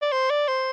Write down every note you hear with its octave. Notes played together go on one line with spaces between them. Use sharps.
D5
C5
D5
C5